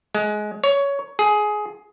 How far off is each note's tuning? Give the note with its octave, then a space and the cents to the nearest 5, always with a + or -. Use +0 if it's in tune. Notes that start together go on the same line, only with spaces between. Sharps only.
G#3 +20
C#5 +15
G#4 +15